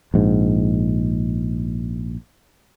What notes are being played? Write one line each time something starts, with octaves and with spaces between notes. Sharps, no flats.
A#1 G#2